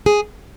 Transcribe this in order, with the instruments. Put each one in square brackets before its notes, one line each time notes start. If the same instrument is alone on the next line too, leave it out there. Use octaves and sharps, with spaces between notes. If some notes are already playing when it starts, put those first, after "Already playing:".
[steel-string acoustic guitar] G#4